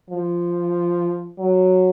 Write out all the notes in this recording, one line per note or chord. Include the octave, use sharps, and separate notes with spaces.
F3
F#3